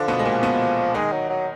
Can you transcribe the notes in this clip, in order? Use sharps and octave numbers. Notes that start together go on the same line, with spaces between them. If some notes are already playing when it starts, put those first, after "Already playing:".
Already playing: D3 F3 D4
B2 B3
G#3
A#2 A#3
B2 B3
D#3 G#3 D#4
F#3
F#3